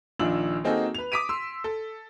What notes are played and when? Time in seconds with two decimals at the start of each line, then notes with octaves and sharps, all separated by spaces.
0.19 A#1 D#3 D4 F4 E6 F#7
0.64 A#3 C4 D#4 F#4 G#4 A4
0.95 B4 F7
1.12 D6 D#6 B6 D7 D#7
1.29 C6 E6
1.64 A4